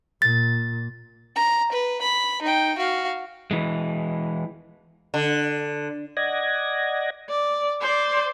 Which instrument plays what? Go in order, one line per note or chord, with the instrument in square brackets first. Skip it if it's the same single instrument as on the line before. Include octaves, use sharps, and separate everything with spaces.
[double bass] A#2 [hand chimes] A6
[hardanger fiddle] A#5
B4
B5
D#4 G5
F#4 F5
[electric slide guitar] E3 G#3
[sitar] D3
[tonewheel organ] D5 D#5 F#5 G#6 A#6
[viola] D5
C5 D5